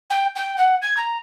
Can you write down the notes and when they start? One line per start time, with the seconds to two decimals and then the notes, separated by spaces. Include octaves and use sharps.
0.10 G5
0.35 G5
0.57 F#5
0.81 G#6
0.96 A#5